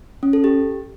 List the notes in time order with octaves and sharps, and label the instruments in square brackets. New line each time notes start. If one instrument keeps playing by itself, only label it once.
[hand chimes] C#4
A4
G4